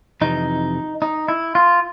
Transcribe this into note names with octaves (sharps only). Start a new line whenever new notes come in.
F2 C3 E3 D#4
D#4
E4
F4